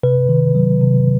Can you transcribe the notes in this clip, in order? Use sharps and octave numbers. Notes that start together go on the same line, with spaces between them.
C3 B4
D#3
F#3
C3